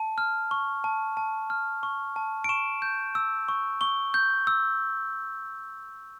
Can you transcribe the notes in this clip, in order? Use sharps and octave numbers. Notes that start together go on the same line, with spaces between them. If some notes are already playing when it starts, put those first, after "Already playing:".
Already playing: A5
F6
C#6
A5
A5
F6
C#6
A5
D7
C#6 E7
G6
E6
C#6
C#6 G7
G6
E6